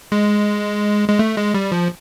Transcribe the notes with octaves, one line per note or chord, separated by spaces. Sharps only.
G#3
G#3
A3
G#3
G3
F3